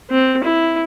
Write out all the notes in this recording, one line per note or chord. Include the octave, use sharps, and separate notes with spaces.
C4
E4